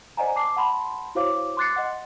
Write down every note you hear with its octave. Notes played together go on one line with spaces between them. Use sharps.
C5 D5 D#5 F#5 G#5 A#5
A5 D6 C7
F#5 A5 B5 C6
E4 F#4 C5 C#5 F5 D6
C6 D6 F#6 A6 C7 C#7
D#5 F#5